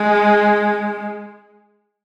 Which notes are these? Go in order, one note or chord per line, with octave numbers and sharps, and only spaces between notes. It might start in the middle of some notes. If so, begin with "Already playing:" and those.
Already playing: G#3